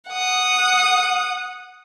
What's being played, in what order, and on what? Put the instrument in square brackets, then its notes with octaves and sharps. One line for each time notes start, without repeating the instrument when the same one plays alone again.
[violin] F#5 D#6